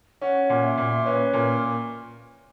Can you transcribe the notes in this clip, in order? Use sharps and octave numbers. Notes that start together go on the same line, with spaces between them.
C#4 F#5
A#2
E5
A#2
C#4 B4
A#2 A#4